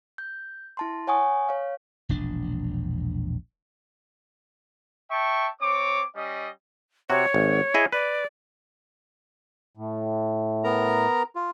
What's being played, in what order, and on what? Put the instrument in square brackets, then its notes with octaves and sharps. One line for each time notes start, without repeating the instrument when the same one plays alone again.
[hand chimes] G6
E4 A5 C6
C#5 F#5 G#5 C#6 D#6
C#5 F5
[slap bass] E1 A#1 D4
[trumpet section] E5 G5 A5 C#6
C4 C#5 D6
G3 C#4 D#5
[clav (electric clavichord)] C3 F#4 [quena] C#5
[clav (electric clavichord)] G#1
E4 G#4 D#5
[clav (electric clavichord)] B4 [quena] D5
[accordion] A2
[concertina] B3 A#4 A#5
F4